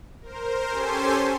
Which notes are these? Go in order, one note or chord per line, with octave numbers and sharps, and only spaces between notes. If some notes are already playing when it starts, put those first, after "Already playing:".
A#4 C5
C#4 G4 A4 C5 G#5 C6